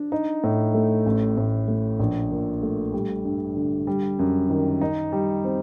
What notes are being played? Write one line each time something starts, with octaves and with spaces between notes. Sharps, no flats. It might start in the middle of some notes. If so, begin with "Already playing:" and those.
Already playing: D4
D#4
A2
A3
A1
A2
A3
A#1
A#2
A3
G3
G2
D3
G3
F#2
D#3
D#4
G3
C4